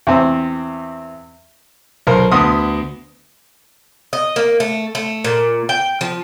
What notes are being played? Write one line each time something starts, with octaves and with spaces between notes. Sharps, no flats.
E2 C4
B1 A#4 C5
D2 B3 C6 D#6
D#5
A#3
A3
A3
A#2
G5
F3